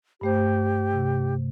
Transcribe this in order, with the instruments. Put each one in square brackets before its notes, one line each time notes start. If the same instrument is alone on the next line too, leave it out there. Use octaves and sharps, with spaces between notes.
[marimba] G2 A3 C5 [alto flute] G4
[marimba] C3